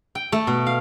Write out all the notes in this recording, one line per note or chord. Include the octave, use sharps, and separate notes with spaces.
G5
A3
B2
F5